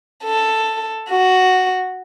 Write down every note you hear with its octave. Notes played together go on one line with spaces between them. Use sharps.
A4
F#4